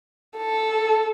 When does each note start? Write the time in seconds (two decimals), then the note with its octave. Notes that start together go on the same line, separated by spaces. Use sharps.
0.37 A4